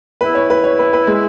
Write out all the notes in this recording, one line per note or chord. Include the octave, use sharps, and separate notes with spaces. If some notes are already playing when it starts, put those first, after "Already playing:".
E2 E3 B3 E4 B4
C#5
B4
C#5
B4
B4
G#3